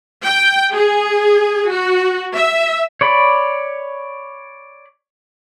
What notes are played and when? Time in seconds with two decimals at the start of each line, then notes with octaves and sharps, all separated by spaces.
0.24 G5
0.75 G#4
1.71 F#4
2.36 E5
3.01 C#5 D5 B5